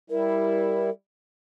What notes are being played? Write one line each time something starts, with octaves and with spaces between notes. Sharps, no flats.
G3 E4 A#4